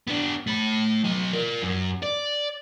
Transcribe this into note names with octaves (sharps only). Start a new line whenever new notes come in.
B3 D4
A3 B5
F#3 D#5
F4 A#4
F#2
D5